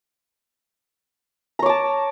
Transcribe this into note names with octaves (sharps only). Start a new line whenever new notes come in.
C#5 A5 A#5 D6